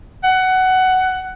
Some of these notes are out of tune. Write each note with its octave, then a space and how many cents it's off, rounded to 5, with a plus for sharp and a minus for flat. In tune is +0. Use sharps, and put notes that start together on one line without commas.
F#5 +15